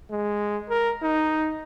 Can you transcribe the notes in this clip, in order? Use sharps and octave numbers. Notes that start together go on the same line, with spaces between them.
G#3
A#4
D#4